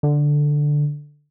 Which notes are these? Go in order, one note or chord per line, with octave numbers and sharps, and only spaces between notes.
D3